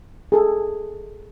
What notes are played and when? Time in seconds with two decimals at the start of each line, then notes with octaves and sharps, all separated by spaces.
0.32 G#4 A4